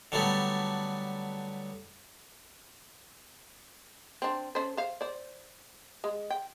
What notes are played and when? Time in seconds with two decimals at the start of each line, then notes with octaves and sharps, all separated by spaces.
0.12 D3 F#3 G3 A3 B3
4.22 C4 D4
4.55 C#4 A4 C5
4.77 C5 F5
5.01 C5 D5
6.04 G#3
6.30 G5